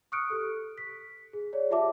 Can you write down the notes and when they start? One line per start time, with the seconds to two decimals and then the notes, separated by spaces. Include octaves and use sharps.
0.12 C#6 D#6 F6 F#6 C#7 D7
0.30 G4 A4
0.78 B6
1.33 G#4
1.53 G#4 C#5 D5
1.70 F4 G4 E5 A5 D6